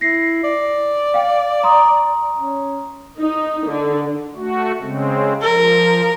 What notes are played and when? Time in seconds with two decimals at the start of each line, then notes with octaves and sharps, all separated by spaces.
0.01 E4 A#6 C7
0.44 D5
1.14 F5 G5
1.63 A#5 C6 D#6
2.38 C#4
3.19 D#4
3.67 D3
4.36 A3 F#4
4.80 C#3 G#3 C4
5.42 F3 A#4